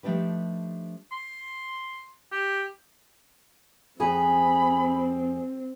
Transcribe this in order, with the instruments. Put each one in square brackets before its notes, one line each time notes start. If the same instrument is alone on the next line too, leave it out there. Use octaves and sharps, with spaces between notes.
[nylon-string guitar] F3 A3 D4 D#4 G4 B4
[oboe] C6
G4
[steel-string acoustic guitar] F2 G#4 G#5 [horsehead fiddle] C4 [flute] B5